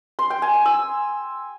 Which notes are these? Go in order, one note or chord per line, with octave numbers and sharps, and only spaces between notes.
C6
G5
G#5
G#5
E6